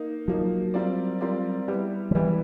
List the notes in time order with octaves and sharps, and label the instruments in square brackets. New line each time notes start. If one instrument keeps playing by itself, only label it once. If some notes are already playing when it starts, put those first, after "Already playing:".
Already playing: [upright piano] A#3 D#4
[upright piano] F3 A#3 D#4 [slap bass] F#3
[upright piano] G3 C4 F4 A#4 D5
G3 C4 F4 A#4 D5
G3 B3 E4 G4
[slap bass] F3
[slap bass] E3 [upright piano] G3 B3 E4 G4